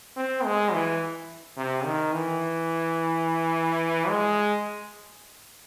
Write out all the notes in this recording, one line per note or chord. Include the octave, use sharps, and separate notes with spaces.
C4
G#3
E3
C3
D#3
E3
G#3